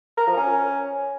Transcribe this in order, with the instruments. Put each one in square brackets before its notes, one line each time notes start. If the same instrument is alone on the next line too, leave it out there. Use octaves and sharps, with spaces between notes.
[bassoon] A#4
F3
C#4